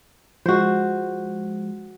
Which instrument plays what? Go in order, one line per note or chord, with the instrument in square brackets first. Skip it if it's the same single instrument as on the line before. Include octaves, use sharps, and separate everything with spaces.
[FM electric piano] F3 G#3 [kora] F#4 C5